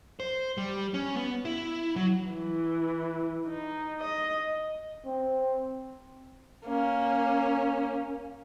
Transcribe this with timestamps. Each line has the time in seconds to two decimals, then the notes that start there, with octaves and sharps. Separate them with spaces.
0.20 C5
0.57 G3
0.94 C#4
1.16 B3
1.45 E4
1.96 F#3
2.29 E3
3.46 D#4
4.00 D#5
5.06 C4
6.66 A#3 C#4